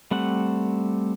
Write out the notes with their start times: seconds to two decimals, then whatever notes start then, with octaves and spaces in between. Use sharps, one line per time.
0.11 G3 A3 C4 F#5